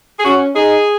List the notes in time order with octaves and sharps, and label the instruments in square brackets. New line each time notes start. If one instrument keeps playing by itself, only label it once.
[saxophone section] G#4
[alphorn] C#4 [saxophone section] F#4
[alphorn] D#4 [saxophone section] G#4